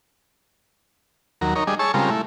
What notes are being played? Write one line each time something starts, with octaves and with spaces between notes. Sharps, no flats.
D#2 F#3 A#4
D#4 A#4 C#5
G3 D4 G#4 D#5
G#4 C#5 A5 C#6 E6
C#3 G3 G#3 C4 F4 A#4
A3 E4